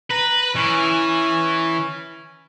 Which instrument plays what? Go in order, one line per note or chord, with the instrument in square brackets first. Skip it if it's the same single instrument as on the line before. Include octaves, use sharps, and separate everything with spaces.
[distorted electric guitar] B4 [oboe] A#5
[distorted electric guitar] E3 [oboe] C#4